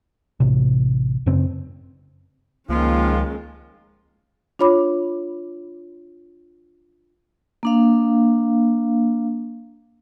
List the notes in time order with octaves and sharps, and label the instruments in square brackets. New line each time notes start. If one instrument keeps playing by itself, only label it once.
[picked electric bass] A1 C3
F#2 C#3 C4
[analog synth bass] C#2 [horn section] D#3 F3 F4 [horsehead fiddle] G#3 C#4 [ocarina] A#3
[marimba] D4 F4 C#5 B5 D6
[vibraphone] A#3 D4 F5